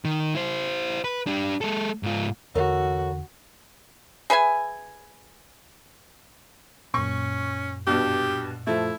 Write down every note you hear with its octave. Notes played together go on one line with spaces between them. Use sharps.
D#3
E4 C5
B4
D4 G4
G#3 A4
G#2 F4
E2 D3 F#4 A4 A#4 C#5
G#4 B4 E5 G#5
F#2 A#2 C#4 C#6
G2 B2 G4
F3 A3 E4